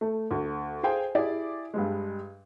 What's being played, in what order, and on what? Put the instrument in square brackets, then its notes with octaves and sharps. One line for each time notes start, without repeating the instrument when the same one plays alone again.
[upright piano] A3
D2
G#4 C5 F5 G5 G#5
E4 G4 G#4 D5
G2 G3 G#3